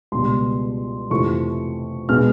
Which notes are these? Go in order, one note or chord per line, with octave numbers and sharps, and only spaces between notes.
C#2 B2 G3 B3 C6
F2 C3 E3 A3 C#6
B2 G#3 B3 F6